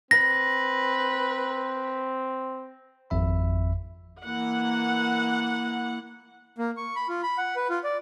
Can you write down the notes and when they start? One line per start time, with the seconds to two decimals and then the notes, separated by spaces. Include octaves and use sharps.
0.11 C4 B4 A#6
3.10 G#1 F2 E5 B5
4.23 E3 A#3 F#5
6.58 A#3
6.77 C#6
6.96 B5
7.08 F4
7.23 B5
7.38 F#5
7.56 B4
7.70 F4
7.84 D5